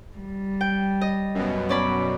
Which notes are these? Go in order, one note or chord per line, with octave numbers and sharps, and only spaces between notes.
G3
G5
D#5
F#2 B2
C#4 D5 B5